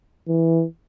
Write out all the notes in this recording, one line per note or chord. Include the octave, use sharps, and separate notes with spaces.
E3